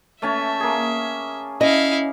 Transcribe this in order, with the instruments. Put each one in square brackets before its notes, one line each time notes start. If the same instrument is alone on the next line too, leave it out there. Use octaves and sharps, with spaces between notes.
[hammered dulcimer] A3 C#4 A5 [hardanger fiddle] E5
[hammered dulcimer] A#3 G#4
[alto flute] C#4 [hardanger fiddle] E4 F5 [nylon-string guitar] D#5